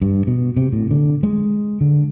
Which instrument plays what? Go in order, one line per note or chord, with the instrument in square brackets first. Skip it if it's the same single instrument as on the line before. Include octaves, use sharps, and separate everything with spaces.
[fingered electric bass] G2
B2
C3
A2
D3
G#3
D3